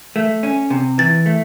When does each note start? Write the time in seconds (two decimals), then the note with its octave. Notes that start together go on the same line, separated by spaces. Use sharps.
0.16 A3
0.43 C#4
0.70 C3
0.98 E3 A6
1.26 A3